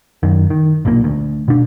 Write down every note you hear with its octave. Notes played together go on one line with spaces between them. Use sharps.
F#2 D#3
D#3
B1 A#2 D3 A#3
D2
B2 D4